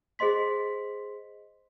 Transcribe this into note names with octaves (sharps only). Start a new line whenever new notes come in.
G#4 C5 D#5 C6 B6